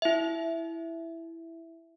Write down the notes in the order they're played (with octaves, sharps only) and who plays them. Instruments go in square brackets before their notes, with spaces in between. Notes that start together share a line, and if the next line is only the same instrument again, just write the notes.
[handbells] E4 E5